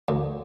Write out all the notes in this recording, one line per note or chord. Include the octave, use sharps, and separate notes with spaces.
D2